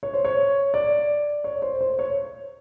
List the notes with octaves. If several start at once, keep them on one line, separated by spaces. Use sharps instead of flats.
C#5
C5
C#5
D5
C#5
C5
C5
C#5